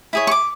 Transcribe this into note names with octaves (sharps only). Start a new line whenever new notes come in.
E4 G#4 C#5
C#6
D6